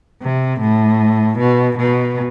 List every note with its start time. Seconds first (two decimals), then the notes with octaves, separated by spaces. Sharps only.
0.22 C3
0.60 A2
1.38 B2
1.78 B2